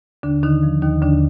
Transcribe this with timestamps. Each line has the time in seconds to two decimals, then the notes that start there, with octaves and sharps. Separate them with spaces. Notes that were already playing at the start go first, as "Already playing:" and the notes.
0.23 D#2 D3 D4
0.43 D3 D#3 D#4
0.63 F3
0.82 D#2 D#3 D#4
1.02 D#2 D3 D4